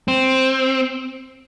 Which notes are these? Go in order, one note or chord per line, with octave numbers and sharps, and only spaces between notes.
C4